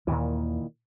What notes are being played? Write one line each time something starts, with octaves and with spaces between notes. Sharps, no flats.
D#2 A#2 D#3 E3